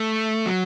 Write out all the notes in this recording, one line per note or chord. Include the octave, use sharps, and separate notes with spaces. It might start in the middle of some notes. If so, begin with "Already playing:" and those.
Already playing: A3
F#3